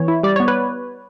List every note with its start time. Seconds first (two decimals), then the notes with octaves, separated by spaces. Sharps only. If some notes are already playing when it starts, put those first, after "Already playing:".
Already playing: E3 B3 C#5
0.08 E4
0.23 G3 D5
0.36 B3 C#5
0.48 B4